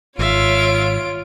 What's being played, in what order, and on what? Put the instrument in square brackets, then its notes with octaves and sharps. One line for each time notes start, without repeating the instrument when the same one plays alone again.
[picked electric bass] G#1 [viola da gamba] F4 [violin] C#5 D7 [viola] E5 F5